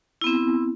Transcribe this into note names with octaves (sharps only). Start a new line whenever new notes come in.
B3 C4 E4